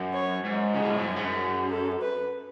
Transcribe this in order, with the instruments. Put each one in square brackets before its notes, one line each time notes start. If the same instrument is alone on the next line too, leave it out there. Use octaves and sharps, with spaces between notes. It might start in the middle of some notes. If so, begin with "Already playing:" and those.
Already playing: [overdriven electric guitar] F#2
[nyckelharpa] C#5
[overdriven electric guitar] G#2
[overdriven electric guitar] C#3 [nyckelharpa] G#4
[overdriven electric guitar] B2
A2
G#2
F#2
G#2
F#2
[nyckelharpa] A4
B4